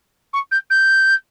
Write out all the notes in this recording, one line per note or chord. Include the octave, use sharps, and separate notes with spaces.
C#6
G6
G6